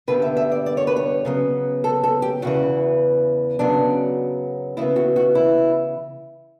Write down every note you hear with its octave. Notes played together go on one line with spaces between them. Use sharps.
G2 D3 G3 B3 B4
E5
E5
D5
D5
C#5
B4
C#5
C#3 F#3 B3
A4
A4
G4
E2 C#3 E3 F#4
F#2 C#3 F#3 B3 D4
C#3 E3 B3 E4
F#4
F#4
E4